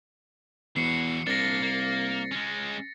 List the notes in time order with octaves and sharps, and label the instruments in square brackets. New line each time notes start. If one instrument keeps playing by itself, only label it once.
[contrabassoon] E2 [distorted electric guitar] E3 F#4 [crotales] C7 C#7
[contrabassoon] C2 [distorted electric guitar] A#3 D4 [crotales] A6 A#6
[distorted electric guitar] A#3
G#3 C#4